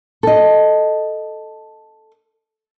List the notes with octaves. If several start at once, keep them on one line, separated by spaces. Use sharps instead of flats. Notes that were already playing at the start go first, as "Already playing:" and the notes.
A4 D#5